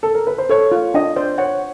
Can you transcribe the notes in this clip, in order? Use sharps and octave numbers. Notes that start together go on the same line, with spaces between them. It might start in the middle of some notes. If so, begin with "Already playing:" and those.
A4
A#4
B4
C5
A4 C#5
F4
D4 D#5
C5 D5
C#5 F#5